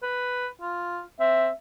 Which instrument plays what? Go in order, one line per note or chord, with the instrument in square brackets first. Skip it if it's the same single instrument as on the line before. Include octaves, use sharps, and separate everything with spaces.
[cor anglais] B4
F4
[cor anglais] C4 [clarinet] E5